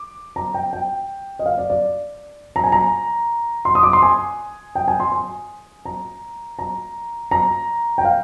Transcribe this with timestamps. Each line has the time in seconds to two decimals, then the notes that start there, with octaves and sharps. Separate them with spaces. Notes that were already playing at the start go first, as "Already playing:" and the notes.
Already playing: D6
0.36 A#5
0.54 G5
0.73 G5
1.39 D#5
1.46 F5
1.58 D5
1.70 D5
2.56 A#5
2.64 G#5
2.72 A#5
3.65 C6
3.75 D#6
3.83 D6
3.93 C6
4.03 G#5
4.75 G5
4.88 G#5
5.00 C6
5.12 G#5
5.85 A#5
6.59 A#5
7.31 A#5
7.98 G5
8.05 F5